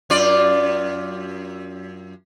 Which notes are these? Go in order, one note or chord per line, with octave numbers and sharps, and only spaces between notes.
F#2 F4 D5